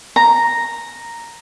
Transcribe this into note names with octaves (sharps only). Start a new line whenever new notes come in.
A#5